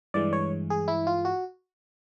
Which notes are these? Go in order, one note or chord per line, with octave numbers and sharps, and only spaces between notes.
G2 E3 G#3 D5
C#5
G#4
E4
F4
F#4